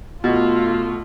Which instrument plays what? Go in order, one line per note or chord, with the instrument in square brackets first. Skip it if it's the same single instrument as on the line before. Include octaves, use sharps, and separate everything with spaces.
[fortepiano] B2 [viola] A3 F4